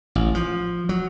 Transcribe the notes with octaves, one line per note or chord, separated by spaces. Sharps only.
A1
F3
F#3